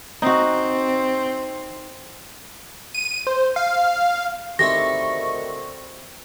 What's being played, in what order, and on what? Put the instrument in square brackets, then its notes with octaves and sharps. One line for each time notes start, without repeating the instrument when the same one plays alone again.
[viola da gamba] C4 [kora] D#4 F#4
[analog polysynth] D#7
C5
F5
[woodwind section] D2 D#3 C#6 [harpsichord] C4 E4 G4 [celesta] A#6